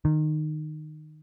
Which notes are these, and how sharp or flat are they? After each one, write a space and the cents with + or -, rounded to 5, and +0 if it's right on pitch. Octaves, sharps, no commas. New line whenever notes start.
D#3 -20